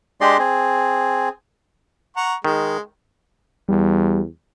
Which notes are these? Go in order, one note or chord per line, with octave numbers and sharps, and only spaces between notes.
G#3 D4 G4 D5 D#5 C6
C4 G#4
F#5 A#5 C#6
D#3 G#3
E2 G3